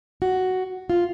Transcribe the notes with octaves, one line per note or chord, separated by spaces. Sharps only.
F#4
F4